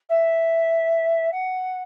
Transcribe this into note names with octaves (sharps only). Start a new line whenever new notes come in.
E5
F#5